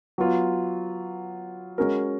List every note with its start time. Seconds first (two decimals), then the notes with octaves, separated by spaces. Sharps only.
0.18 F#3 B3 F4
1.78 G#3 C#4 F#4 A#4